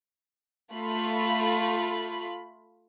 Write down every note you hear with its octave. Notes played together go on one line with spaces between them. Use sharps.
A3 F4 B5